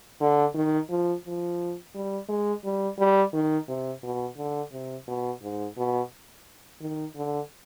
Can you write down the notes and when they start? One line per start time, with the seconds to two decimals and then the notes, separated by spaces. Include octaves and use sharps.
0.21 D3
0.55 D#3
0.89 F3
1.25 F3
1.95 G3
2.29 G#3
2.64 G3
2.99 G3
3.33 D#3
3.68 C3
4.03 B2
4.37 D3
4.72 C3
5.08 B2
5.42 G#2
5.77 B2
6.81 D#3
7.16 D3